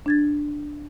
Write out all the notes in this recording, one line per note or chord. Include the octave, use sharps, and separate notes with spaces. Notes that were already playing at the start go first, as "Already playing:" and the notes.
D4 G#6 A6